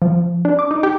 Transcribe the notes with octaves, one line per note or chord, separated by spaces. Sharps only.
F3
D4
D6
D#4
G4